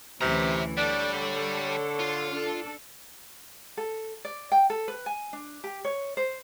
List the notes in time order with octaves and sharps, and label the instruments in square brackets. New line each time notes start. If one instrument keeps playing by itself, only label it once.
[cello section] D2 E3 C#4 [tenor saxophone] C3 [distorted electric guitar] E5 A#5
[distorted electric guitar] G3 [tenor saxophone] D4 [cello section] A4 C#5
[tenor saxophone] D3
[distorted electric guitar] F4
[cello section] D4 A4
[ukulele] A4
D5
G5
A4
B4
G#5
D4
G4
C#5
C5